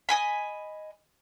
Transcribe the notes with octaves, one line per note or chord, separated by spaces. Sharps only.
D#5 G#5 B5